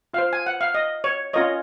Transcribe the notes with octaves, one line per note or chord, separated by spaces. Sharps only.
F4 C5 F5
G#5
F#5
F5
D#5
C#5
C#4 F4 A#4 C#5 D#5